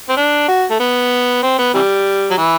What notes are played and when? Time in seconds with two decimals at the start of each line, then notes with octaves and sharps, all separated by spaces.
0.09 C4
0.17 D4
0.48 F#4
0.70 A3
0.79 B3
1.43 C4
1.58 B3
1.74 C3 E3 G3
2.31 F#3
2.37 E3